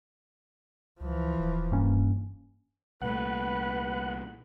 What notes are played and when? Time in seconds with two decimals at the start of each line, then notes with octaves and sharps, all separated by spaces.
1.01 C#2 E3 F3
1.39 D#1
1.72 G2 A#3 C#4
3.02 C2 A#2 A3 B4 F#5